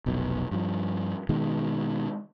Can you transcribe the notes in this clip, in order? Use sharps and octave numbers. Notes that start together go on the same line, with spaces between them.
F1 B1 B2
G2 F3
B2 D#3 G#3